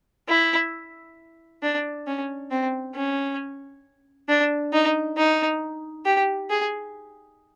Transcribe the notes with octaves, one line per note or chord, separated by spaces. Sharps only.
E4
D4
C#4
C4
C#4
D4
D#4
D#4
G4
G#4